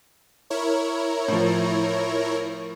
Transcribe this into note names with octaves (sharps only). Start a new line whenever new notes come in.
E4 A#4 C#5
A2 F3